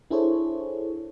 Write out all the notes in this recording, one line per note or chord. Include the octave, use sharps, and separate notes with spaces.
D4 E4 G#4 A4 C5 C#5